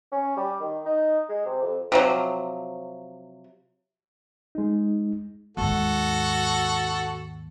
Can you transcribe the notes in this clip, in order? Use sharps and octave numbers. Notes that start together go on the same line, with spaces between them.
C#4
G3
D#3
D#4
G#3
C3
F2
C3 F3 F#3
G#3 D#4
D#2 G#2 F#4 A4